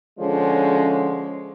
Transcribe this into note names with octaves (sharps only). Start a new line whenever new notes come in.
D3 F3 G#3 C#4